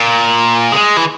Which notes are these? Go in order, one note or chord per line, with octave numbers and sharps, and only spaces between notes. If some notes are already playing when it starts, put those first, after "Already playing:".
Already playing: A#2
G#3
E3